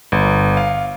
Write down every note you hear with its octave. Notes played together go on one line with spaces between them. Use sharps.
G1
F5